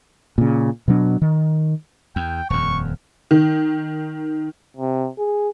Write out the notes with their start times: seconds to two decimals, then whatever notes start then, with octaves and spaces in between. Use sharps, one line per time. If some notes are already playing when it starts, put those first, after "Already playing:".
0.38 A#2 C#3
0.88 B2 F#3 D4
1.21 D#3
2.16 E2 G5
2.50 D#1 F2 C#6
3.31 D#3
4.77 C3
5.19 G#4